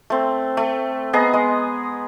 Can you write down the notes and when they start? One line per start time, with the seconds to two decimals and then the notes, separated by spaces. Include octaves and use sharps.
0.10 A3 C4
0.57 A3
1.13 B3 G#4 D#5 A#5
1.34 G#3